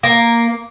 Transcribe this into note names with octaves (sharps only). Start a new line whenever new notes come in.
A#3